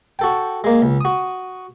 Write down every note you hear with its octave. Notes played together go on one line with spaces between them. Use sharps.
F#4 A4 G5
G#3 A#3
C#2
F#4 D#6